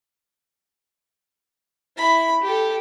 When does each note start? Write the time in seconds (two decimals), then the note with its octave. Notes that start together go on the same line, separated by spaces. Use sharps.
1.97 E4 B5
2.42 G4 A4